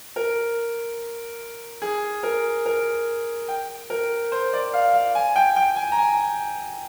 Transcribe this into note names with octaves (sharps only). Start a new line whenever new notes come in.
A#4
G#4
A#4
A#4
G5
A#4
C5
D5
F5
F5
G#5
G5
G5
G#5
A#5
G#5